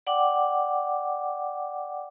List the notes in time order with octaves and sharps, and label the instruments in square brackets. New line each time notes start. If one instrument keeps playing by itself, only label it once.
[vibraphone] D5 F#5 G5 D6